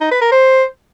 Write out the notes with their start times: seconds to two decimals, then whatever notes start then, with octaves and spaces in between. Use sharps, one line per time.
0.01 D#4
0.11 B4
0.22 A#4
0.32 C5